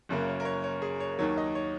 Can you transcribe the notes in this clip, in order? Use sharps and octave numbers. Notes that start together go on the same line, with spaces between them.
F#1 F#2 C#3 A#3
C#5
A#4
C#5
C#5
G#4
C#5
D#2 D#3 F#3 C#5
D#5
C#5